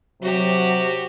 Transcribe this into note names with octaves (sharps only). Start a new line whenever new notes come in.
C3 F#3 F#4 G4